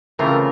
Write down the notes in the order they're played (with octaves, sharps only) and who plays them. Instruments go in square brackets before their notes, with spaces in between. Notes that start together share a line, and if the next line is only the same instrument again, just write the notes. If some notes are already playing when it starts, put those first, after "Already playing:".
[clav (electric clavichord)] C#3 E3 A3 C4 F4 [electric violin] A#4